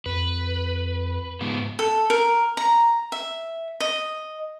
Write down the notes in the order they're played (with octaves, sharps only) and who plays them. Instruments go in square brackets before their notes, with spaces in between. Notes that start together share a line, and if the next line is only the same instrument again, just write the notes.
[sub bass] F2 [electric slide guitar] B4
[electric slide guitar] G#2 B3
[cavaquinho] A4
A#4
A#5
E5
D#5